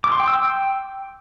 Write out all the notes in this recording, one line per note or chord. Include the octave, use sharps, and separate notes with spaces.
D6
C6
G5
E6
G5